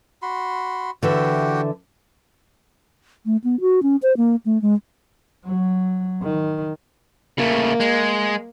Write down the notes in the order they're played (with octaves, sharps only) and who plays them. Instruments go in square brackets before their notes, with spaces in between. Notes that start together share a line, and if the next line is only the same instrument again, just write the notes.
[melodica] F#4 B5 C6
[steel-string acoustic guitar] D3 E3 E5 [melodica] F#4 G4 G5
[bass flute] A3
B3
F#4
C#4
C5
A#3
A3
G#3
[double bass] F#3
D#3
[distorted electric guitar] C#3 A3 [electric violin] A#3
[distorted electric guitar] G#3